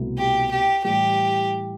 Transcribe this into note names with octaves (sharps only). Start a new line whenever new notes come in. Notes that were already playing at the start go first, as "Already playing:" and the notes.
Already playing: C2 B2 A3 E4
G4
G4
A2 E3 G3 G4